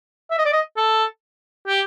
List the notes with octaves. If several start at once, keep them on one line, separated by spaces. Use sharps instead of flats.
E5
D#5
D5
D#5
A4
G4